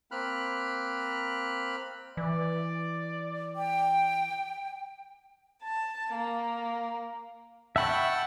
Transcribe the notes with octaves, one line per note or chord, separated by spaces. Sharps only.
A#3 C4 B5 F6 F#6
E3 D5
G5
A5
A#3
E5 F#5 G5 A5 B5 C#6